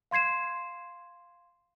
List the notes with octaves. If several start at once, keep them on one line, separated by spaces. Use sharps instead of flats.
F5 C6 G#6 C7 E7